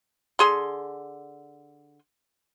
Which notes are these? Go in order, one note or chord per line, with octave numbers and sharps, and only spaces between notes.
D3 G#4 C6